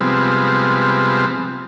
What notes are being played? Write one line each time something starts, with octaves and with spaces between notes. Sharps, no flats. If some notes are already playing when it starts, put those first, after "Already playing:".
C3 F3 G3 G#3 B3 C4